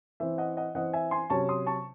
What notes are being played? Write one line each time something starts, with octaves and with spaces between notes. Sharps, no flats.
E3 C4 E5
D#5 F#5
D#5 F#5
E3 C4 D#5 F#5
E5 G#5
G#5 C6
C3 F#3 C#4 A5 C#6
C6 D#6
A5 C#6